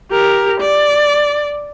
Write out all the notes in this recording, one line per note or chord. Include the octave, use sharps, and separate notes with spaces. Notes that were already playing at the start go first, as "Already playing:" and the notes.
G4 A#4
D5